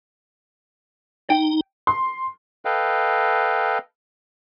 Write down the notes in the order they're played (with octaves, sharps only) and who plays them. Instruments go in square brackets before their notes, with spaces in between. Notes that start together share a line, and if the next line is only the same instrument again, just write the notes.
[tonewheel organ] D#4 [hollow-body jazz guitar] G5
[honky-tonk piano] C6
[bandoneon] A4 B4 D#5 F5 G5